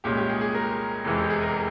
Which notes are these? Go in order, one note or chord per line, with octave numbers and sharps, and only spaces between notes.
C2 A#2 G#3 C#4 G4
G4
G#4
G#4
A#4
F1 E2 C3 E3 G#3
G4
G#4
A#4